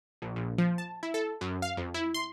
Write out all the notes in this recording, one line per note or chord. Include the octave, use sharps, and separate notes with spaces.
A#1
A#1
F3
A5
E4
A4
F#2
F5
F2
E4
C6